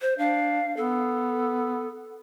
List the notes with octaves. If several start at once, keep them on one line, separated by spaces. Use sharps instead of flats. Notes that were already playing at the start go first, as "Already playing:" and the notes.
C5
D4 F5
B3 A4